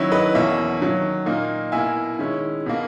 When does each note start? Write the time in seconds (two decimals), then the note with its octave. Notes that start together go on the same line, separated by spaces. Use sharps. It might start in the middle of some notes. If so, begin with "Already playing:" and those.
Already playing: D#3 F#3 C#4 E4
0.11 B4 D#5
0.34 E2 B2 A#3 C#5 E5
0.80 D#3 F#3 C#4
1.26 A#2 A#3 D#4
1.72 B2 A#3 E4 E5 G#5
2.19 D#3 G#3 C#4 E4
2.66 B2 A#3